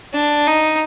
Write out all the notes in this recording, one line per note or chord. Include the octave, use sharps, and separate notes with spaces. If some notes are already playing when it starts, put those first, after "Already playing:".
D4
D#4